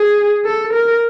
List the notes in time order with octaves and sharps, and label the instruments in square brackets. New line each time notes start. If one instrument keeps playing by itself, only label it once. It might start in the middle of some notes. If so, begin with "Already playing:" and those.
Already playing: [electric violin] G#4
A4
A#4